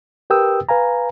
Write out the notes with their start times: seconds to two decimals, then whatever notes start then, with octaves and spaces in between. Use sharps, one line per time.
0.30 G4 A#4 B4 G5 D#6 E6
0.69 B4 F5 G#5 A#5